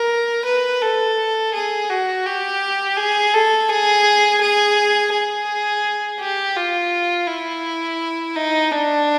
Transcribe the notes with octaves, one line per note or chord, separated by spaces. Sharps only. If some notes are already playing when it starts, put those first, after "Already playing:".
Already playing: A#4
B4
A4
G#4
F#4
G4
G#4
A4
G#4
G#4
G#4
G4
F4
E4
D#4
D4